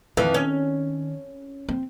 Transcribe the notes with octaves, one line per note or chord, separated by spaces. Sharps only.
F2 D#3 E3
C#4
C4